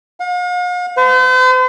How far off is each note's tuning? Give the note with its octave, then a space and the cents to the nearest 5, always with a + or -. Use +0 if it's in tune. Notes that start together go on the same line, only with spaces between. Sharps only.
F5 +45
C5 -45